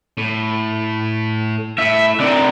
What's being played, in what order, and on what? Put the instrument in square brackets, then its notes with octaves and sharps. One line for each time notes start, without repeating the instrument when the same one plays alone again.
[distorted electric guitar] A2
[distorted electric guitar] A2 [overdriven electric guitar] E5
[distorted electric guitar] C3 A4 [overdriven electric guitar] D4 A#4